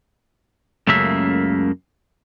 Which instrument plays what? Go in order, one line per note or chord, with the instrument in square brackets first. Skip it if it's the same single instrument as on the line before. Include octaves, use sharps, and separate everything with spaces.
[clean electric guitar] C#2 F#2 C#3 A3 A#3 E5